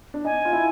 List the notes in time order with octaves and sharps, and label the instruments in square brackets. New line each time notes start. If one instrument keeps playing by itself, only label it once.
[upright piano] D4
[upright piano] D#4 [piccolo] G#5
[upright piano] F4
E4